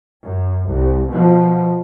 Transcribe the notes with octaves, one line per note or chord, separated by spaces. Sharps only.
F#2
C2
B2 F3